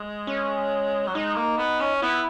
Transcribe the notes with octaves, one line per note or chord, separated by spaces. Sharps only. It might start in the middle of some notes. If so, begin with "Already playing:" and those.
Already playing: G#3
C#4
F#3
G#3 D#4
A#3
B3
C#4
B3 E4